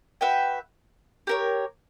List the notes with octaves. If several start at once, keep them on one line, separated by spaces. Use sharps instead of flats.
F#4 B4 E5 G5
G4 A#4 C#5